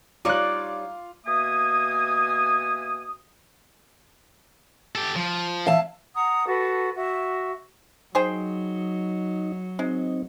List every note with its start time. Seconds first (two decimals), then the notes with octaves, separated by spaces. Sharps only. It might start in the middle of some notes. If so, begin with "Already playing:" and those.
0.25 G3 D#4 F4 C#5 D5 D6 F#6
1.25 B2 A#3 E5 G#5 D#6
4.95 G4 A4
5.16 F3
5.67 E5 F5 A5
6.14 F#5 A#5 D#6
6.46 F#4 A4 B4
6.95 F#4 E5
8.15 F#3 D#4 G#4 C5 G5
9.79 G#3 C4 D#4